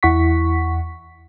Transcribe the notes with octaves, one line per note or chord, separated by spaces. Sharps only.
E2 E4 F#5 C#6 B6